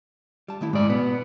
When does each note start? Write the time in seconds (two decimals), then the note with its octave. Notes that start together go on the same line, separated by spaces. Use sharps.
0.48 G3 A5
0.61 D#3 A3 E4
0.73 G#2 G#3 D5
0.90 B2 B3